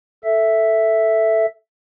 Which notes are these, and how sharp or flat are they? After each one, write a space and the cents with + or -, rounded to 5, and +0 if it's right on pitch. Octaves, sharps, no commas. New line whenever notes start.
A4 +0 E5 +0